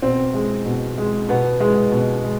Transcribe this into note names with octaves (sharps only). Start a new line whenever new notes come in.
B2 C4
G#3
B2
G#3
B2 B3
G#3
B2
G#3